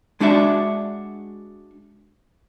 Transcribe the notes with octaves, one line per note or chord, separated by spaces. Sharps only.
G#3 D4 F#4 D5 E5